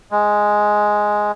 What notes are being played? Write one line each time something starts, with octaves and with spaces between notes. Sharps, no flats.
G#3